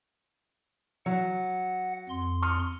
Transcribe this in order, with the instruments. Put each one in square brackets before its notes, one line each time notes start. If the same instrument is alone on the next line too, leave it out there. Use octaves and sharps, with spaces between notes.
[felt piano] F#3 [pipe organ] F#5
[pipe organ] F2 C6
[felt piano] C#6 D#6 F6